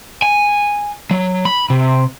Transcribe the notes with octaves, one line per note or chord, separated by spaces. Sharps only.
G#5
F#3
B5
C3